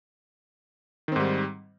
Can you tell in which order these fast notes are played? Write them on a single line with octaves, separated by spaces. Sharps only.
D#3 C4 G#2 G3